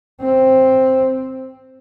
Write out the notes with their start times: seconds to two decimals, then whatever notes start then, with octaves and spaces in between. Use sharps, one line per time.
0.21 C4